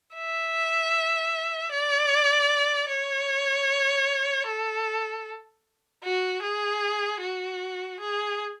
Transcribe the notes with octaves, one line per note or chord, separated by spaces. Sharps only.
E5
D5
C#5
A4
F#4
G#4
F#4
G#4